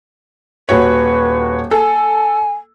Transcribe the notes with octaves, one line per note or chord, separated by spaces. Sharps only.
D#1 F#4 B4 C#5
A4 G#5